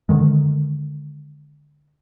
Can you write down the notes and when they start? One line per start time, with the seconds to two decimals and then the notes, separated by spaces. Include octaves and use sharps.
0.09 D3 D#3 G#3